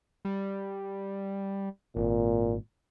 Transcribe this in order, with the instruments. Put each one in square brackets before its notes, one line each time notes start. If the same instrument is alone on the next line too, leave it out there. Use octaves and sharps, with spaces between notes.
[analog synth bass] G3
[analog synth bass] G#1 [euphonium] A#2